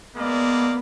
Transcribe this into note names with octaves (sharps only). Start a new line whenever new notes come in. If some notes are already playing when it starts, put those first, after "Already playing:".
G#3 A#3 B3 D5